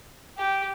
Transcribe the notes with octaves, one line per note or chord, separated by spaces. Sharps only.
G4